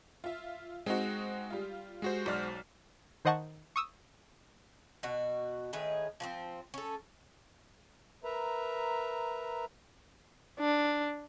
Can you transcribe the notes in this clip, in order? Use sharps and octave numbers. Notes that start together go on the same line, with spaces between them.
F4 E5
G#3 C4 D#4 F#4
G3 F4
G#3 F#4 C5
B1 D5 F6
D#3 C5 D#5 F#5 A5 C#6
C#6 D#6 E6
B2 F#4
A2 D#3 G#4 B4
F3 B3 C4
C#4 A4
A#4 B4 E5 A#5
D4